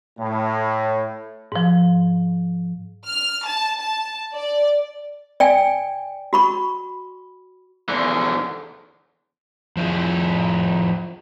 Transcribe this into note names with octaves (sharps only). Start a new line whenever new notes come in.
A2
G#2 F3
F6
A5
A5
D5
D5 G5 G#5
F#4 B5 C#6
E2 D3
F3 E4 G#4